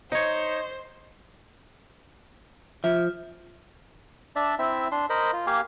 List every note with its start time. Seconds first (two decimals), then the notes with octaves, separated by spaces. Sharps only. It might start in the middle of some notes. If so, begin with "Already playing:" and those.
0.12 D#4 C5 C#5 D#5
2.84 F3 E5
4.36 D4 D5 E5
4.59 C4 E4 E5
4.92 D4 C6
5.10 A#4 C5 D#5 B5
5.33 F4
5.47 A#3 G4 F5 G#5